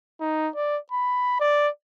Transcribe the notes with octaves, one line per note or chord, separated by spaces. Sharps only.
D#4
D5
B5
D5